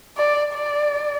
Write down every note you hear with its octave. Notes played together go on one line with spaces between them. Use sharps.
D5
D5